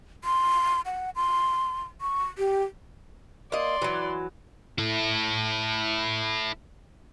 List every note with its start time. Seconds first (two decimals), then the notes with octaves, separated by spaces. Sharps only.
0.24 C6
0.86 F#5
1.16 C6
2.01 C#6
2.38 G4
3.52 A#3 D5 D#5 C6
3.82 E3 F#3
4.78 E4 A4